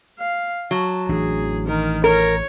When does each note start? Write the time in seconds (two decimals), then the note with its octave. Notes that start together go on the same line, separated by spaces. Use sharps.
0.19 F5
0.71 F#3 A5
1.09 A1 E3 D4 G#4
1.67 D#3 A#4
2.04 A#4 C#5